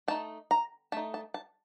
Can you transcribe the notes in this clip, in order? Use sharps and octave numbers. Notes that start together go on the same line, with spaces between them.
A3 D#4 A5
A#5
A3 D#4 A5
A5
A5